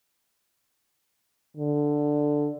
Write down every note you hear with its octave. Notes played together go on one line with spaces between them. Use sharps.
D3